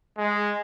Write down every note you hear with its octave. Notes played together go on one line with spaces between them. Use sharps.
G#3